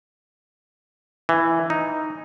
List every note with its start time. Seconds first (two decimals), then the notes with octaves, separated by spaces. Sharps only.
1.29 E3
1.70 D#4